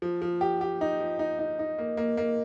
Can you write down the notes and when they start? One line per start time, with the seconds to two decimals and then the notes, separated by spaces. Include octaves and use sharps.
0.02 F3
0.22 F3
0.41 G4
0.61 G4
0.81 D#4
1.00 F3
1.19 D#4
1.39 D#4
1.59 D#4
1.78 A#3
1.97 A#3
2.17 A#3